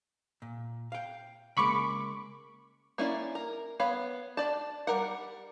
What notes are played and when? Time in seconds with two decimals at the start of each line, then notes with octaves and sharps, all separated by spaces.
0.42 A#2
0.92 F5 G5
1.57 C#3 G#3 A#3 B5 C#6 D6
2.98 A#3 C#4 E4 D5
3.35 A#4
3.80 B3 C#5 F5 B5
4.37 D4 D5 A5
4.87 G3 A#4 F#5